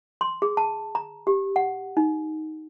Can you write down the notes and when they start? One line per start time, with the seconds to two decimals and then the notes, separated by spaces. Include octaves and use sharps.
0.21 C6
0.42 G#4
0.57 A5
0.95 A#5
1.27 G4
1.56 F#5
1.97 D#4